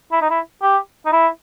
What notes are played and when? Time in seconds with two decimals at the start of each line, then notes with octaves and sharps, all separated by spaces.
0.12 E4
0.21 D#4
0.30 E4
0.62 G4
1.06 D#4
1.13 E4